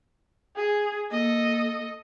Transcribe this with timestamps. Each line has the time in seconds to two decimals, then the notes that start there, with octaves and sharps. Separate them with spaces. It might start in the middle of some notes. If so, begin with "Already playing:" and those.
0.56 G#4
1.11 A#3 A4 D#5